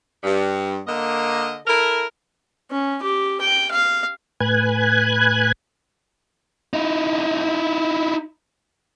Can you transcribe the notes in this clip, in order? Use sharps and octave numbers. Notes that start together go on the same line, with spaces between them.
G2
D3 A#3 A#4 D#5
E4 A4 A#4
C#4
G4
G5
F5
A2 B4 G#5 F#6 G#6
D#4 E4